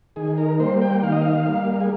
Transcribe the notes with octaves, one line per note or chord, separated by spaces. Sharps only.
D#3 G#4
A#4
G3 A#3 C5
G5
D#3 F5
D#5
F5
G3 A#3
G#4